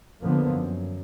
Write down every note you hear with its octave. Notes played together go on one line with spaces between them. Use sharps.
F2 D3 F3 A#3 B3
F#2